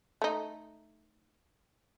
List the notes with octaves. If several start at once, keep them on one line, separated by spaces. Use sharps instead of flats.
A3 D#4